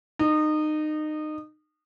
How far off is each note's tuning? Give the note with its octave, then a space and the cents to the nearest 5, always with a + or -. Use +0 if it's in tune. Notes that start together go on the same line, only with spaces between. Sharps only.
D#4 -25